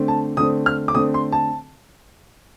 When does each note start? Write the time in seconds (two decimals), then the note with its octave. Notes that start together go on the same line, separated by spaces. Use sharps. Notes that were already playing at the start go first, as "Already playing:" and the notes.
Already playing: D3 A3 C4
0.08 A5
0.37 D3 A3 C4 D#6
0.66 F6
0.88 D6
0.95 D3 A3 C4 D#6
1.14 C6
1.32 A5